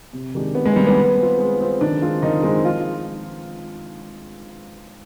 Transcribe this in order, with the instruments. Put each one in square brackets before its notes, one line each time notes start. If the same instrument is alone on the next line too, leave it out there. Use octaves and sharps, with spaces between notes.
[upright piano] C3
D#3 G#3 D4 G4
[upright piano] C3 [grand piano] B3
[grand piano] G#3
[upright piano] D#3 G#3 D4 G4 [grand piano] G3
[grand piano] B3
[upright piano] G#3
C4 F4
G#3
C4 F4
[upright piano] D#3 [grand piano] D4
[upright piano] G#3 C4 F4
[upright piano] D#3 [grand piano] D#4
[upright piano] G#3 C4 F4
[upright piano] F3 [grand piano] F4